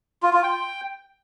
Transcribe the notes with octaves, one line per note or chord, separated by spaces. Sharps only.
F4
F4
G5